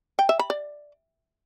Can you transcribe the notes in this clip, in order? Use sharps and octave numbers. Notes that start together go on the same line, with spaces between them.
G5
E5
B5
D5